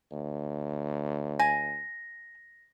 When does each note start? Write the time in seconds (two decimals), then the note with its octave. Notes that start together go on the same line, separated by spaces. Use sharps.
0.12 D2
1.40 G#5 A#6